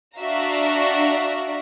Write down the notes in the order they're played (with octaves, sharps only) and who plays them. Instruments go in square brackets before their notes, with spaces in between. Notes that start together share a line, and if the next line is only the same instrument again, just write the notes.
[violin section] D4 F#4 D5 E5 F5 A#5